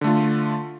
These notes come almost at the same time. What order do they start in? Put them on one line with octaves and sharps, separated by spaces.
D3 A3 F4